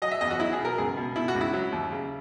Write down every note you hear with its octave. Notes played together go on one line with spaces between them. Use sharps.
F#3 D#5
E5
E2 D#5
F#4
F#3 E4
G#4
B2
A#4
C#2 G#4
B2
B2 E4
F#4
C#2
E4
F#3
D#2
C#3